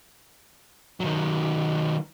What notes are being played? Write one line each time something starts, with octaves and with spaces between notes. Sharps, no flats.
D#3 F#3